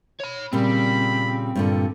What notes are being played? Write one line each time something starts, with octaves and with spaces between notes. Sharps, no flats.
C#5 B5
A#2 C#3 G3 C4 B5
G2 A#2 D3